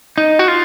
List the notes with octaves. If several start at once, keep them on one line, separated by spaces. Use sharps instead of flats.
D#4
F#4
F4